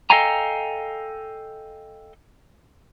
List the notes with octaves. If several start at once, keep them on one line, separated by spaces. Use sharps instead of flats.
A4 D#5 F5 G5 G#5 A#5